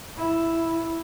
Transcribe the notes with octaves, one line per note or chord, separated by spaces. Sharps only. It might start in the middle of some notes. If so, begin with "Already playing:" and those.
E4